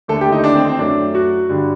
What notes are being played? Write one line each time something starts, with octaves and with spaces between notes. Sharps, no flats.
D#2 D3 A3 A4
G4
D#4
D4
C4
C4
F#2 F#3 A3 D4
F#4
G2 D3 G3